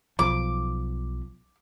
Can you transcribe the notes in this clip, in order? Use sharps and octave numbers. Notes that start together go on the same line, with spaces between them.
B1 F3 D6